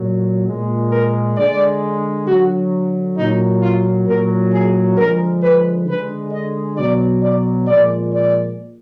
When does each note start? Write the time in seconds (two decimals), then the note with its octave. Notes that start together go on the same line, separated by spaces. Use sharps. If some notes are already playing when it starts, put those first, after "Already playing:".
Already playing: A#2 F#3
0.47 A#2 G#3
0.92 A#4
1.37 D3 G#3 D5
2.27 D3 F#3 F#4
3.17 A#2 F#3 D#4
3.62 F4
4.07 A#2 F#3 A#4
4.52 G#4
4.97 D3 F3 G#3 A#4
5.42 B4
5.87 D3 G#3 B4
6.32 D#5
6.77 B2 F#3 D5
7.23 D5
7.67 A#2 F3 G#3 D5
8.13 D5